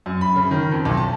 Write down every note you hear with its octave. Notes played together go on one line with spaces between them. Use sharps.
F#2
B5
C#3
D#3
F2
B1
A5